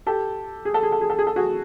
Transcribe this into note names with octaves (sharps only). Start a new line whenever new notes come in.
G4 A4
G#4
A4
G#4
A4
G#4
A4
G#4
A4
F#4 G#4